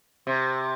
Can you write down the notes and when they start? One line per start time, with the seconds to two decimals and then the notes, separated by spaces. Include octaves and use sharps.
0.27 C3